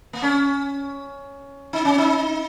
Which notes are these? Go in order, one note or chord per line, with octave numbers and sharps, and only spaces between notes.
A#3
C#4
D#4
C#4
D#4